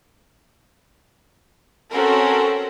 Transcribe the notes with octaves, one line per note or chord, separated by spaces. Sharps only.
C4 C#4 F#4 A4 A#4